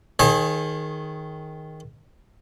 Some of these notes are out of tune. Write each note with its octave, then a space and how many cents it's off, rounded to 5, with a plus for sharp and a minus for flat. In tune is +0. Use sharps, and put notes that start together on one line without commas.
D#3 +5 G#4 +15 C#5 -45